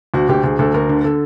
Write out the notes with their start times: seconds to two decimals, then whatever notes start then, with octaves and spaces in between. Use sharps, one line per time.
0.14 D2 F#4
0.29 D2 G4
0.44 D2 G#4
0.59 D2 A4
0.74 D2 A#4
0.89 D3
1.04 D3 A4